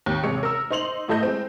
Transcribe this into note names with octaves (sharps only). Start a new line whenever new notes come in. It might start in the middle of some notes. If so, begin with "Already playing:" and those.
D#2
A1 C3 G#3 C#5 C#7
A#4 E6
D#4 C5 C6 F7 F#7
A2 A3 E4 A4 D#5 G6
G#3 C4